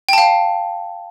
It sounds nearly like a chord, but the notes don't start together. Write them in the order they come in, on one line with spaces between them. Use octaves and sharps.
G5 A5 F5